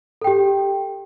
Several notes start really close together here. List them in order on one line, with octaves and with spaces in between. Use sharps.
A4 G5 G4